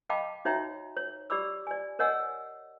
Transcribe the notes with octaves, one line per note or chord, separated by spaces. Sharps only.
D#5 F5 G5 A5 B5 D6
D#4 F#4 C#5 E5 G5 A#5
C#5
G4 D5 B5 D6 E6
D5 G#5
A#4 C#5 D#5 F#5 G#5 E6